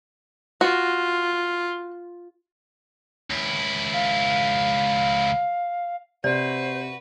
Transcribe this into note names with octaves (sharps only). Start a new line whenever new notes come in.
F4 F#4
C#2 E4
F5
C3 F#4 B4 C5 D5